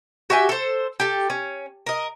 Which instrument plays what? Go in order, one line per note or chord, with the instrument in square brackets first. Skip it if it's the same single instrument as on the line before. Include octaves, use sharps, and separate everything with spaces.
[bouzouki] F#4 G4 E5 G#5
A4 C5
G4 A4
C#4
A#4 D#5